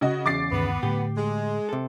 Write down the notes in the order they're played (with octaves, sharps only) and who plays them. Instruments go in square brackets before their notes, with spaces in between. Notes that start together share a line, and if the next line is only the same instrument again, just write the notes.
[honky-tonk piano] C#3 F#4 D#5
[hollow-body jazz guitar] E2 C#3 [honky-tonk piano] D6 A6 C7
[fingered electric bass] D2 G2 D#3 [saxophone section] B3
[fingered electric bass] A2 D3 A3 [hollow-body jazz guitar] G4
[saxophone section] G#3
[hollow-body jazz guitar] C3 A4